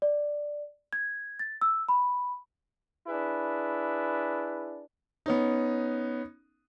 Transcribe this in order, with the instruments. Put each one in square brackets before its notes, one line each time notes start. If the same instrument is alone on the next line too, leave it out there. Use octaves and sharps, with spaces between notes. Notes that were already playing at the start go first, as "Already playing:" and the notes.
[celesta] D5
G#6
A6
E6
B5
[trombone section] D4 E4 G#4 B4
[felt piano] B3 C#4 D#4